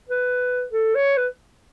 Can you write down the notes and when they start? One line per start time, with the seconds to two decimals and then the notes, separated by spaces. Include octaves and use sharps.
0.09 B4
0.72 A4
0.95 C#5
1.17 B4